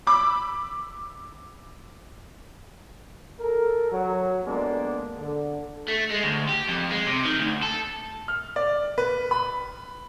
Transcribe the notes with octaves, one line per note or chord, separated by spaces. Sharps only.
B5 D6 E6
A4 A#4
F#3
F2 G#3 A#3 B3 D4
D3
A3
G#3
D2
G4
F2
G#3
C3
D#3
D2
A4
F6
D5
B4
B5